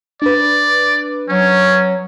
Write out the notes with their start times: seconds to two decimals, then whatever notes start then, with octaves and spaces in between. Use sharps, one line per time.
0.22 D4 B4 D5
1.29 F#3 C#4